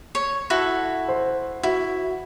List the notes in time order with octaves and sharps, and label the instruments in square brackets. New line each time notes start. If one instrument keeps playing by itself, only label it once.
[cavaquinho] C#5
E4 F#4 A4
[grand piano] C5
[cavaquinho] E4 [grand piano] F#4